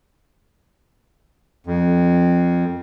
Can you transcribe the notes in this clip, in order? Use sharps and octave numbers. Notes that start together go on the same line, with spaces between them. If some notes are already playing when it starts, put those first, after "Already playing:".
F2